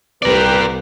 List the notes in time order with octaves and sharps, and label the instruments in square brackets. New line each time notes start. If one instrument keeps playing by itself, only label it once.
[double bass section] C2 [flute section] G4 B4 [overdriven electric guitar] A#4 D5